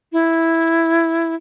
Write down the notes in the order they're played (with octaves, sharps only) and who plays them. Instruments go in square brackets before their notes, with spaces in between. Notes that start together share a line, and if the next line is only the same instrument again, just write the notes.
[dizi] E4